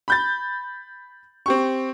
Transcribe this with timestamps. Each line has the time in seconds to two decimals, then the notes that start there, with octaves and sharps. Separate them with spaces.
0.08 B5 G6 A6
1.46 C4 G4 C#6